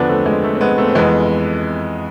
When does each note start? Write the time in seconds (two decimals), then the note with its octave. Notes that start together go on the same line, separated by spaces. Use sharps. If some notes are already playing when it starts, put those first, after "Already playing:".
Already playing: E2 D3 F3 B3 D4
0.09 A3 C4
0.26 G#3
0.44 A3
0.55 C4
0.61 G#3 B3
0.78 A3 C4
0.89 C4
0.95 F2 E3 G#3 B3